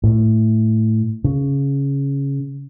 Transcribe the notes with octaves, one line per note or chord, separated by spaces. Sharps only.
A2
C#3